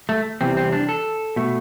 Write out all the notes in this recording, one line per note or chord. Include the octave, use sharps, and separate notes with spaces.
A3
E2 C3 E3 G3 C4
C4
D4
A4
B2 A3